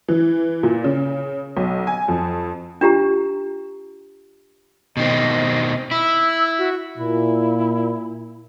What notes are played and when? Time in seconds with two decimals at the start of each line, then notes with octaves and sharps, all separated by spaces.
0.08 E3
0.63 A#2
0.84 C#3
1.57 B1
1.87 G#5
2.08 F2
2.81 D4 F4 G4 A#5
4.97 B2 D#3 C4 D#5
5.91 E4 E6
6.58 F#4
6.98 A#2 E4